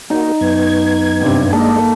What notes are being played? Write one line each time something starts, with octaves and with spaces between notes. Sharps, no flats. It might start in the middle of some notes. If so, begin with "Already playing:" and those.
A#3 D#4 F#4
F#2 B3 G#6
G2 C3
G#3 A#3 A4 D5 D#5